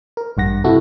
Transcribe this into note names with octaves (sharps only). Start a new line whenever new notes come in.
A#4
A1 G2 F#5 A#6
C3 E4 F#4 A4